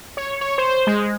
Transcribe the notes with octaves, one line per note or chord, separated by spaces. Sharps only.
C#5
C#5
C5
G#3